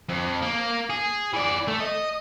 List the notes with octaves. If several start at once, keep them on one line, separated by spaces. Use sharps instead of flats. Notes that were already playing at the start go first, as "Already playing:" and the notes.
F2
A#3
G#4
E3 D5
A3
D#5